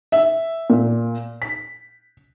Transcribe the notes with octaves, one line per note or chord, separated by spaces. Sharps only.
E5
A#2
B6